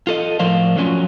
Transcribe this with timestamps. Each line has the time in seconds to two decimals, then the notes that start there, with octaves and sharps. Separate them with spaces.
0.07 F4 A4 D#5
0.39 A2 F3 A#4 C5 D5 F5
0.76 D3 F3 F#3 C#4 F4